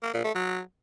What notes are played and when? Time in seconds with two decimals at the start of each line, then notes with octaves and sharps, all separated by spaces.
0.03 A#3
0.14 A#2
0.24 A3
0.35 F#3